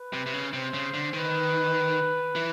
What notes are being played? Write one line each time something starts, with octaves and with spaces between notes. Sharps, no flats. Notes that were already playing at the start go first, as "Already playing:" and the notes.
Already playing: B4
C3
C3
C#3
C3 C5
C#3
D3
D#3 B4
E3